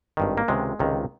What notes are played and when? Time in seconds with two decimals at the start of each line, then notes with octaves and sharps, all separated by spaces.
0.17 G#1 G2 D#3
0.38 A#3
0.48 C#2 C3 D#3 G#3
0.79 C#2 C3 D#3